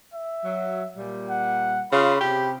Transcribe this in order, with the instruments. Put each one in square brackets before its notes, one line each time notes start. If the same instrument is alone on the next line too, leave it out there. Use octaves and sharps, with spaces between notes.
[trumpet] E5
[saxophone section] F#3
A#2 G3
[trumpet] F#5
[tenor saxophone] C#3 [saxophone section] F4 [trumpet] B5
[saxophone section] C3 [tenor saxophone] G4